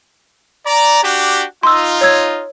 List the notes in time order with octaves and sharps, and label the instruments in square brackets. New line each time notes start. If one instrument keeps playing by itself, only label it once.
[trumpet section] D5 A#5
D4 F#4 G4
[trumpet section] D#4 F4 [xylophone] C6 E6
[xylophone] C#5 E6 G#6